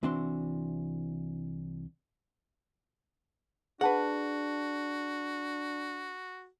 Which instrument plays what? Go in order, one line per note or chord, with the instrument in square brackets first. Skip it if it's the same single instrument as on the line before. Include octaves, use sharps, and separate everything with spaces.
[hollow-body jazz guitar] C2 E3 C4 D4 F#4 C6
[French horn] D4 [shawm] F#4 [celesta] G#4 A5 [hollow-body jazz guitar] B4 F#5